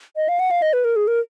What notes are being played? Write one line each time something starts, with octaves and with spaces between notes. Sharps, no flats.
D#5
F5
F#5
F5
D#5
B4
A#4
G#4
A#4